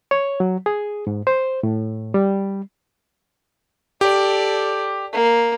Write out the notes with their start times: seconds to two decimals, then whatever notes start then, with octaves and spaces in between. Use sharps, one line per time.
0.11 C#5
0.40 F#3
0.66 G#4
1.07 G#2
1.27 C5
1.63 A2
2.14 G3
4.01 G4 A4 D5
5.13 A#3